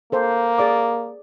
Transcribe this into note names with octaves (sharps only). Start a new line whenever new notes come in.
A#3 A4 C5
G#4 D5 D6